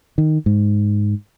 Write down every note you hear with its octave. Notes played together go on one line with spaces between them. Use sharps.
D#3
G#2